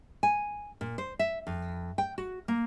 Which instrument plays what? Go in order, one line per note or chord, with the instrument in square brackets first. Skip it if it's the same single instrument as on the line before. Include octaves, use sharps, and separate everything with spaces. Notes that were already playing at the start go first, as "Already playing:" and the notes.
[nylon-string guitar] G#5
A#2
C5
E5
F2
G5
F#4
A#3